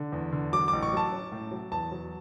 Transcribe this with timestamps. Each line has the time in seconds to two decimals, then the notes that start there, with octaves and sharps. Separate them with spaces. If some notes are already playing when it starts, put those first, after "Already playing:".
Already playing: D3
0.12 E2
0.32 D3
0.53 F#3 D6
0.68 A1 D6
0.82 C#6
0.93 F#3 A5
1.12 C#4
1.32 A2
1.51 F#3
1.71 E2 A5
1.92 F#3